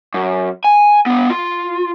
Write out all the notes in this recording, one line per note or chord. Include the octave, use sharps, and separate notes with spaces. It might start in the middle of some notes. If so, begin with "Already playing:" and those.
F#2
G#5
B3 D4
F4